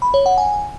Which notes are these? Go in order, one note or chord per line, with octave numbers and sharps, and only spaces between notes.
B5
C#5
F#5
G#5